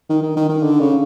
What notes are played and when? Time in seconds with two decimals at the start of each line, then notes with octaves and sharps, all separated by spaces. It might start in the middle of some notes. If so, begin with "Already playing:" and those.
0.10 D#3
0.23 D#3
0.36 D#3
0.50 D#3
0.63 D3
0.80 C#3